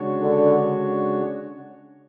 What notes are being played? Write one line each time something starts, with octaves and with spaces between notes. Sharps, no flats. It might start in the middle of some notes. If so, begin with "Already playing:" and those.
Already playing: C#3 G#3 D4 F#4 C#5
D3